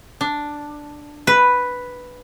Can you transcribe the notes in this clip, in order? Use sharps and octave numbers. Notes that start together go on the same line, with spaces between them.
D4
B4